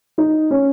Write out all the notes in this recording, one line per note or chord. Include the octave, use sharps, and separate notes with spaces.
D#4
C#4